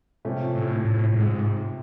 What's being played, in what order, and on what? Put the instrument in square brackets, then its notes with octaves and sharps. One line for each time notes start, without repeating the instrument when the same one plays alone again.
[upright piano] C3 F3 A3 C#4
[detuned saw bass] A2
A2
G#2